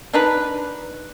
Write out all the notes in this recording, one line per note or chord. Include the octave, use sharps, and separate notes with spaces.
D4 D#4 B4